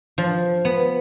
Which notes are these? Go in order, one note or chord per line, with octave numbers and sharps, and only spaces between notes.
F3
B3